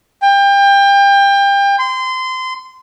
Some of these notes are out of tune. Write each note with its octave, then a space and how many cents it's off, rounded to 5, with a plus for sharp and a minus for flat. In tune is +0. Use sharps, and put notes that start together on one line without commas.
G5 +30
C6 -25